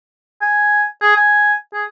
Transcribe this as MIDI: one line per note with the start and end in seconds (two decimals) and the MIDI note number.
0.41 0.85 80
1.02 1.16 68
1.16 1.54 80
1.73 1.84 68